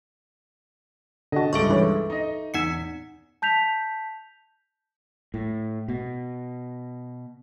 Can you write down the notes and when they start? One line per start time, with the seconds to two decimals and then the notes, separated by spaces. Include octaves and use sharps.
1.32 D3 F#4 D#5 A5
1.53 C#2 G2 G#3 A4 E5 C#6
1.69 E3 B4 C#5
2.10 D#4 D#5
2.54 E2 D#4 F#5 C#7
3.42 A5 G6 B6 F7
5.34 A2
5.89 B2